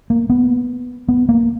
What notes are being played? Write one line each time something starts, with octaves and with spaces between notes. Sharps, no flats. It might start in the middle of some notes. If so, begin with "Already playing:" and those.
A#3
B3
B3
A#3